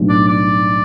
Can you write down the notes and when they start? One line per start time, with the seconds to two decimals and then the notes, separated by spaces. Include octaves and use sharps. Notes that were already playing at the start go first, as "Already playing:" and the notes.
Already playing: B1 A2 G3 D4
0.09 D5
0.28 D5